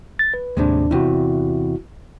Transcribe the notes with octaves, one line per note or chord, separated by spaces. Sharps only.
A6
B4
D#2 A2 C3 G#3 D4
E2 C3 E4 F#4